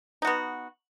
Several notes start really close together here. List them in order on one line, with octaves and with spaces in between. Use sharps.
D#4 F#4 B3